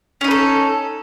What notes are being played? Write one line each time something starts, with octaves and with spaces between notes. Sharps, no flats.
C#4 D#4 A4 B4